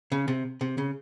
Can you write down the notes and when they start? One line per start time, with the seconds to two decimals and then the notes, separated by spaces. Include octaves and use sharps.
0.12 C#3
0.28 C3
0.61 C3
0.78 C#3